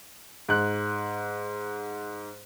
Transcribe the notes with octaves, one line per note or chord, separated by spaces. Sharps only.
G#2 F#6